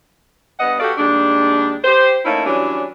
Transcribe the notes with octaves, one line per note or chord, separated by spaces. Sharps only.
G2 B3 D#5 F#5
F#4 G4 A4 D5 F5
D#2 G3 G#3 D4
G4 C5
A3 A#3 C#4 D#4 E4
E3 F#3 G3 C#4 D4